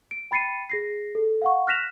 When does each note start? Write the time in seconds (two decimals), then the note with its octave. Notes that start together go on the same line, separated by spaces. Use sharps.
0.11 D7
0.31 G5 B5 A6 C7 C#7 D#7
0.70 G#4 A#6 C7
1.15 A4
1.42 F5 F#5 C#6
1.67 F6 F#6 A#6 B6 E7 F7